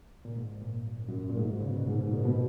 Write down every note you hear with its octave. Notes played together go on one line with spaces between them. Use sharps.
A#2
G#2
A#2
F#2
F#2
A#2
G#2
C#3
B2
A#2
G#2
G#2
A#2
B2